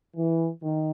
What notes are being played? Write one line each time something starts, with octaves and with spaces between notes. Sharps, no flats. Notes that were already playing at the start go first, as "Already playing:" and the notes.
E3
D#3